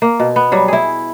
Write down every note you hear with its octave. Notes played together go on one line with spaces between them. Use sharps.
A#3
B2
B3
F#3 G3
E4 G#4